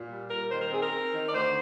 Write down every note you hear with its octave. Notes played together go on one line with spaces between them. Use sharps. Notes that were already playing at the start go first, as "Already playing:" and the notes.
Already playing: A#2
G3
A#2 A#4
D#3 C5
A#4
C4 G#4
A#4
C4
D#3
D5
D2 C5